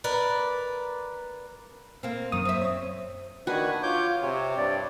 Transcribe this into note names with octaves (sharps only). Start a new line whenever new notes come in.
A#4 B4 D5
A#3 C4
F#2 D#3 D#6
C4 E5
C#5
D#3 D4 F#4 B4 G#5
F4 C#5 D6 G6
C3 C#5
G2 D5